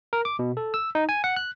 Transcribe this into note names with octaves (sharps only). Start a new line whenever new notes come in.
A#4
D6
B2
A4
E6
D#4
G#5
F#5
F#6